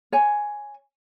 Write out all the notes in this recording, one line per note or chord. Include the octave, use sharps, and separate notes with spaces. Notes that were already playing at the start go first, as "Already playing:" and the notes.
C#5 G#5